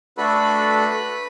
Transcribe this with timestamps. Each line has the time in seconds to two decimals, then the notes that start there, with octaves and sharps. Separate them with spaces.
0.17 A3 D4 F#4 A4 B4 B5